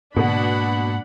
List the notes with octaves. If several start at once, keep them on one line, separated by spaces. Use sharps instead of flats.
G#2 B2 D3 A#3 B3 D4 F#5 B5